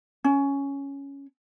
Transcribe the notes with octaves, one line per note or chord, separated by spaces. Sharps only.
C#4